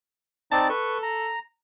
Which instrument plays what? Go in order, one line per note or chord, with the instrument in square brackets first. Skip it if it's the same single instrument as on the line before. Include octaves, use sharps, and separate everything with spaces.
[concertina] C4 D#4 D5 [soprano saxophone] A5
[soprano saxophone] A4 [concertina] B4 C#6
[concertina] A#5